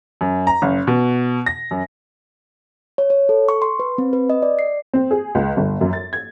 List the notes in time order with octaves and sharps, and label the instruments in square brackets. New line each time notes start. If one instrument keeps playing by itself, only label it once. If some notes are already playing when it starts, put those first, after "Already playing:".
[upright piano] F#2
A#5
F#1
B2
A#6
F#2
[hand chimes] C#5
C#5
A4
C#6
C6
B4
C4
B4
D#5
D5
C7
[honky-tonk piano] C4
G#4
C#2
G1
F#2
A6
G#6